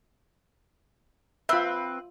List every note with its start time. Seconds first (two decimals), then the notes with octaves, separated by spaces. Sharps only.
1.49 C4 F4 B4 E5